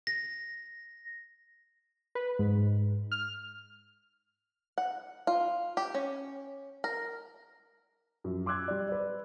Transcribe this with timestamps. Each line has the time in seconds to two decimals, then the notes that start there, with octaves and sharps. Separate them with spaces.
0.07 A#6
2.15 B4
2.39 G#2
3.12 F6
4.78 F#5
5.27 F4
5.77 G4
5.95 C#4
6.84 A#4
8.24 F#2 F3
8.46 C6 D6 E6 F#6 G#6
8.68 G3 D5
8.89 B4 D5